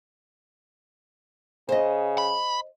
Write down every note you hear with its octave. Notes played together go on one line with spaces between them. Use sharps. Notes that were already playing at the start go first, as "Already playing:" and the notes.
C#3 C5 D#5
B5